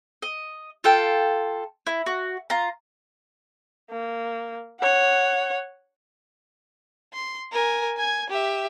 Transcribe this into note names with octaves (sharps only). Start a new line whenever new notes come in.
D#5
F4 A4 G5
E4
F#4
F4 A#5
A#3
C#5 F#5
C6
A#4 G#5
G#5 G#6
G4 E5